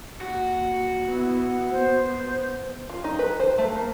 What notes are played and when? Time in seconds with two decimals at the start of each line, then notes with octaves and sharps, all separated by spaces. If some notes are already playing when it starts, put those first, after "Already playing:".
0.21 D#2 F#4
1.06 B3 E4
1.71 B3 C5
2.90 F4
3.04 D#4
3.19 B4
3.40 C5
3.58 A3
3.75 A#3